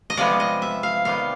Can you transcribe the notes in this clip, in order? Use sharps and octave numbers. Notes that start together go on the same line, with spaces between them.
D#5
C3 F3 G#3 B3 D5
D#5
E5
F5
C3 D#3 G3 B3 F5